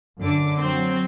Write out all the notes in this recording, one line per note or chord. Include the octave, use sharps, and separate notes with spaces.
F#2 D3 D6
F#3 C4